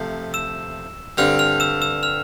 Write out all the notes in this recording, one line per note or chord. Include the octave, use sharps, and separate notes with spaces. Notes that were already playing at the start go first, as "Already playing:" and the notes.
Already playing: C3 F3 A3
E6 E7
G2 D3 G3 C4 F6 F7
F6 F7
E6 E7
E6 E7
F6 F7